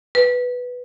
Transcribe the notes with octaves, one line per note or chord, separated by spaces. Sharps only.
B4